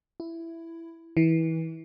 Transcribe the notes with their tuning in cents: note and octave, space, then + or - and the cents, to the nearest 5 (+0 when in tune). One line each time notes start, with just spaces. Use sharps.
E4 +10
E3 -25